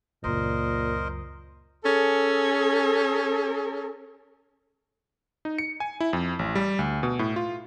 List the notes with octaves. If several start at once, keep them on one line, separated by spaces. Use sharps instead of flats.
C#2 F#2 A#2 A#4 C5 D#5
C#4 G#4 A4
D#4
C#7
G#5
E4
F2
A1
G3
D2
B2
A2
F4